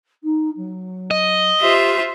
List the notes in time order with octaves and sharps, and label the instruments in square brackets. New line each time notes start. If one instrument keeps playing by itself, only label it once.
[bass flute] D#4
F#3
[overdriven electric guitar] D#5
[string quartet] F4 C5 E5 [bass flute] G4